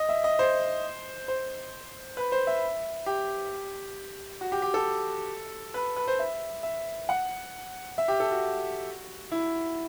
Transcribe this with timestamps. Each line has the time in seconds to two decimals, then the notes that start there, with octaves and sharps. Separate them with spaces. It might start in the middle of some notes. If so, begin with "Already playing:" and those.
Already playing: D#5
0.09 E5
0.24 D#5
0.39 C5
1.28 C5
2.17 B4
2.32 C5
2.47 E5
3.06 G4
4.41 F#4
4.52 G4
4.62 G4
4.74 A4
5.74 B4
5.96 B4
6.08 C5
6.19 E5
6.63 E5
7.09 F#5
7.98 E5
8.08 G4
8.20 A4
8.31 F#4
9.32 E4